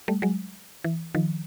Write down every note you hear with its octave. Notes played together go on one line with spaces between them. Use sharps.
G3 A3
F#3 G#3
E3
D#3 F3